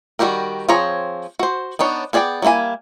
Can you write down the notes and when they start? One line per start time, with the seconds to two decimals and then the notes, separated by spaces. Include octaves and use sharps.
0.19 D#3 G3 F#4 G4 A#4
0.69 F3 C4 G#4 C#5 A#5
1.39 F#4 C5
1.79 B3 D4 D#4 C#5
2.13 B3 G#4 D5 F5 G5
2.42 F#3 G3 A#3 E4 G#5